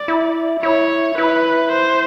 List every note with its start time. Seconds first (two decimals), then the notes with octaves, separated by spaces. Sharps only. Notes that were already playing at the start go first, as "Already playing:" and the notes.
Already playing: D5
0.08 E4
0.63 E4 C#5
1.18 E4 B4
1.72 C5